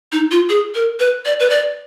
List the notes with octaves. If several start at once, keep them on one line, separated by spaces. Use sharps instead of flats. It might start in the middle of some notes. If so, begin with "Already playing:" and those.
D#4
F4
G#4
A#4
B4
D5
B4
D5